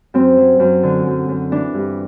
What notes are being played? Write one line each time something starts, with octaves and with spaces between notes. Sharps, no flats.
F#2 C4
F#3
F#2
D3
F#2
F#2
E3 D4
G2